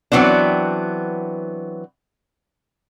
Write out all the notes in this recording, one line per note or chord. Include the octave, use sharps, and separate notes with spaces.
E3 F#3 B3 C4 D4